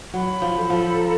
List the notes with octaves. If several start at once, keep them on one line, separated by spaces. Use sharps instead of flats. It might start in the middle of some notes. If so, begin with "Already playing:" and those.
F#3 B5
F3
A4
F3
A#5